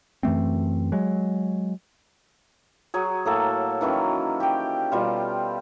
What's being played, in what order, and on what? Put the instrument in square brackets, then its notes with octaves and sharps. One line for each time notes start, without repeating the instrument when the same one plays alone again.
[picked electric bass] F#2 E3 A3 C4
F#3 G#3
[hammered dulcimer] F#3 F#4 G#4
A2 A#3 A4
D#3 E3 F#3 C#4
G4 G5
B2 G3 F4